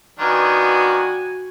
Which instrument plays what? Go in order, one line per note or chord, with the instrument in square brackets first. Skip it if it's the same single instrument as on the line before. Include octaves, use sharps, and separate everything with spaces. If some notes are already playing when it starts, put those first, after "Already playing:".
[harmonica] D#3 B3 D4 [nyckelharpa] F#4 G#5